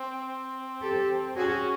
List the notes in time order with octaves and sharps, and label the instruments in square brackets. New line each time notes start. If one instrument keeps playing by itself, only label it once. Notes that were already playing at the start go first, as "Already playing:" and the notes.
Already playing: [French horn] C4
[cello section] G4 A4
[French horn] C#4 [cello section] F#4 G#4